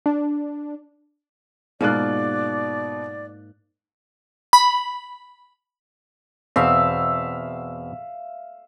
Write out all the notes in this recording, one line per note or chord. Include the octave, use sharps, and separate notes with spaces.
D4
G#2 B2 A#3 F4 D5 F#6
B5
E2 B2 C4 E5 F5